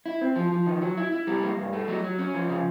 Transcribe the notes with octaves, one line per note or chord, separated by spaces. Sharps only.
E4
C4
F3
F3
D#3
F#3
E4
E4
G3
A#3
G2
A3
F#3
F#3
C#4
F3
C#3